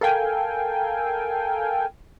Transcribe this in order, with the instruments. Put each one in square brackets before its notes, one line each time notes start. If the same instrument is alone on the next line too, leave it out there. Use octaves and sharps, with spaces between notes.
[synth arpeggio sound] A4 A#4 F5 G5 G#5